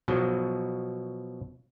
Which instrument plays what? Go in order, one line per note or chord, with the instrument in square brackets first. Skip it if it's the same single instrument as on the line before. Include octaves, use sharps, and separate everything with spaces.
[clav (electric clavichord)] B2 F3 F#3